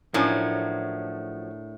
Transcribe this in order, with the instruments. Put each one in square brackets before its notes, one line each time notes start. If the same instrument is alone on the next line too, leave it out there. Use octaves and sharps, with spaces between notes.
[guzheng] A2 [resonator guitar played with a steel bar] F3 F#3 C#4 [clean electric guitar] D4 A4 A#4